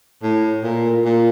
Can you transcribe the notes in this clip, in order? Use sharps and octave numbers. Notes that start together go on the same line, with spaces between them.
A2
A#2
A#2